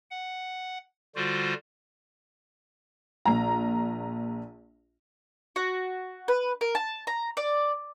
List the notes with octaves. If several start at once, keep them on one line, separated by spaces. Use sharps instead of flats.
F#5
D3 G3 F4 F#4 C5
A#1 A#5
F#4
B4
A#4
A5
A#5
D5